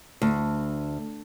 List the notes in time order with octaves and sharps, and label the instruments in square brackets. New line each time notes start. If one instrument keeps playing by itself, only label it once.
[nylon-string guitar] D2